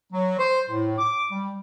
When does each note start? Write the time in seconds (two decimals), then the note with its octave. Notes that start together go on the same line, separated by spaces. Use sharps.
0.12 F#3
0.38 C5
0.70 A2
0.98 D6
1.31 G3